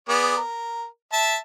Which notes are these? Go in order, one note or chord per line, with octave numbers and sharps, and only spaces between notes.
B3 G#4 D5
A#4
E5 A5